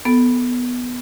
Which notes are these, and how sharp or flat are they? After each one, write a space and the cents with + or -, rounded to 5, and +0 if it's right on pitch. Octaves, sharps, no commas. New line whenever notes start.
B3 +0 A4 +0